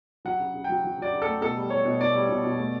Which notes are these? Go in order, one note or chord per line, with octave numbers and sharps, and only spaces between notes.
F#3 F#5
C#3
C#3
F#3 G5
F#3
F#3 D5
C#3
A3 A4
B2 A4
G3
G3 C#5
B2
B2 D5
G3
B2
B2
A3